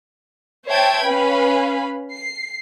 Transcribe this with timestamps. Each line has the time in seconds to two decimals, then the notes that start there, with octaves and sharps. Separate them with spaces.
0.67 C5 C#5 E5 G5 A5 G#6
1.05 C#4 B4 F5 B5
2.13 C7